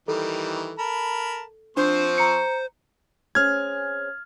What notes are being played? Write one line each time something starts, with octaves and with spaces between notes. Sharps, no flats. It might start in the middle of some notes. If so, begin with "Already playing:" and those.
D#3 E3 G3 A4
A#4 A5 B5
F3 C4 D4 C5 C#6
A#5 C#7
C4 C#4 G#4 F6 G#6